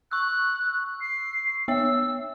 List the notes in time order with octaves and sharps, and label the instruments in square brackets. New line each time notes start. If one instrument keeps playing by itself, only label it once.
[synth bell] C#6 E6 [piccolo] F#6
[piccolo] C7
[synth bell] B3 C#5 E5 [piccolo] E6